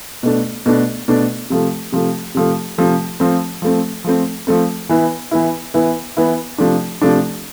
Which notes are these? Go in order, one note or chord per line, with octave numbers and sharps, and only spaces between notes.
B2 A3 D4
B2 A3 D4
B2 A3 D4
C3 F3 A3
C3 F3 A3
C3 F3 A3
C3 F3 A3
F3 A3 C4
F3 A3 C4
F3 A3 C4
F3 A3 C4
E3 B3 E4
E3 B3 E4
E3 B3 E4
E3 B3 E4
C3 F3 A3 D4
C3 F3 A3 D4